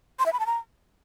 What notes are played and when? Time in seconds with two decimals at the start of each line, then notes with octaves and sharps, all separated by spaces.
0.19 C6
0.26 E5
0.33 B5
0.40 A5
0.46 A#5